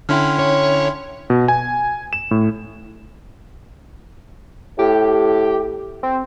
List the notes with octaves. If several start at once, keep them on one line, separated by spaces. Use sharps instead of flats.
D3 C#4 E4 G5 C6 F6
C#5
B2
G#5
E7
A2
A2 G4
C4